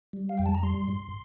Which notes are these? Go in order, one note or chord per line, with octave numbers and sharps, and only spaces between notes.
G3
F5
F2 G5
A5
A#5
G3 C6
G2